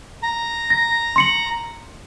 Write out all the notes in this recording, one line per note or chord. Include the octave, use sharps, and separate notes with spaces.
A#5
A#6
C6 C#7 F#7